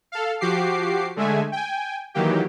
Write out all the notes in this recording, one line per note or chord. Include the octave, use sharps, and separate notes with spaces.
A4 F5
F3 F#4 G4 D6 C7
D3 G#3 A3 E5 G#5
G5 G#5
D#3 E3 F#3 A#3 G4